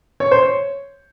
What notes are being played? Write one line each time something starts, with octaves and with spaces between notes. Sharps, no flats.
C#5
C5
C#5